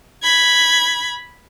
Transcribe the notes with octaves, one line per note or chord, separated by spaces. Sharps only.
B5 G#6